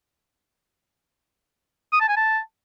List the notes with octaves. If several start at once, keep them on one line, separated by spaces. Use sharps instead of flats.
D#6
A5
G#5
A5